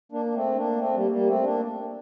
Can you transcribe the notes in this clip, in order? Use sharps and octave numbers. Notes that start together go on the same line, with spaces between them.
A#3 D4
D4
A3 C4
A#3 D4
A3 C4
G3 A#3
G3 A#3
A3 C4
A#3 D4